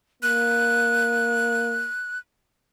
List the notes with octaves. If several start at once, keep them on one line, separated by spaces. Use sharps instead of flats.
A#3 F#6